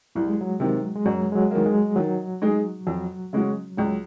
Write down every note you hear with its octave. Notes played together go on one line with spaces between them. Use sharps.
C2 F#3
G#3
F#3
C3 D#3
G#3
F#2 F#3
G#3
F#3
D#3 A#3
G#3
D#3 F#3
G#3 D#4 G#4
F2 F#3
C#3 G#3 C#4 F#4
C#2 F#3